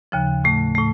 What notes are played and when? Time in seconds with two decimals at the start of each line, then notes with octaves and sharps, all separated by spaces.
0.12 D#2 C#3 F3
0.44 A2 A3
0.75 A2 A3